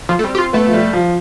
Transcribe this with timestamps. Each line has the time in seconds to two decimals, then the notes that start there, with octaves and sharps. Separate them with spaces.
0.09 F3
0.19 A3
0.24 G3 C4
0.35 G4
0.38 F4
0.53 A3 B3
0.66 F3
0.74 G3
0.93 F3